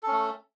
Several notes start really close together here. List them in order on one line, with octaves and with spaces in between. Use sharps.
A4 C#4 A3